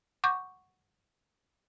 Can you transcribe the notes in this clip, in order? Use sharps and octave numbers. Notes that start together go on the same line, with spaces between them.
F#5 C#6 D6 G6